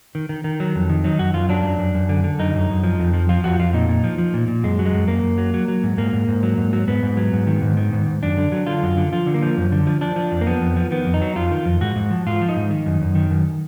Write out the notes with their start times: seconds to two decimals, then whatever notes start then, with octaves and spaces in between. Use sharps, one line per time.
0.15 D#3
0.29 D#3
0.44 D#3
0.60 F#3
0.75 F2
0.89 D#3
1.04 F#3 D#4
1.19 F#2 F#4
1.34 F#2 F4
1.49 F#3 D4
1.64 F#2
1.79 F#2
1.95 F#2
2.09 D3
2.24 D3
2.39 F#2 D#4
2.55 F#2
2.70 F#2
2.84 F3
2.99 F2
3.13 F3
3.29 F3 F4
3.44 F2 F#4
3.59 F2 F4
3.73 A#2 D#4
3.89 A#2
4.04 F3
4.18 F3
4.34 A#2
4.48 A#2
4.64 F#2 G#3
4.79 F#3
4.85 G#3
4.94 F#2
5.08 F#2 A#3
5.23 F#2
5.38 F#3
5.54 F#3
5.68 F#3
5.83 G#2
5.97 G#2 A#3
6.13 G#2
6.28 G#2
6.43 F#3
6.58 G#2
6.73 F#3
6.88 G#2 B3
7.03 G#2
7.17 F#3
7.33 G#2
7.47 D#3
7.62 G#2
7.77 D#3
7.93 G#2
8.07 G#2
8.22 F#2 D4
8.38 D3
8.52 F#3
8.67 D3 F4
8.83 F#2
8.97 D3
9.13 F3 F4
9.26 D3
9.34 A#3
9.43 F3
9.57 F#2
9.72 D3
9.87 F3
10.01 F3 D4
10.16 F3
10.32 F2
10.41 A#3
10.47 F3 B3
10.61 F2
10.76 F3
10.91 D#3 B3
11.06 F2
11.14 D#4
11.21 F#3
11.36 F2 F4
11.52 D#3
11.66 F2
11.81 G#2 F#4
11.96 G#2
12.11 F3
12.26 G#2 F4
12.42 F3
12.49 D#4
12.56 G#2
12.71 D#3
12.86 F#2
13.01 F#2
13.15 D#3
13.30 F#2